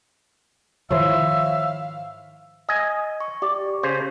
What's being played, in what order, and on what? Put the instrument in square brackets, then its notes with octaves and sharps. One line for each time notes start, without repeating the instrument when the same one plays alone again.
[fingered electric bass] G#2 D#3 F3 [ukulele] E4 C5 C#5 [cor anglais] E5 [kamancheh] F5
[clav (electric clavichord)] D#5 G#5
[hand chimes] C#6
[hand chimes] G4 [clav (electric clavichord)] D5
[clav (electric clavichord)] C#3 C5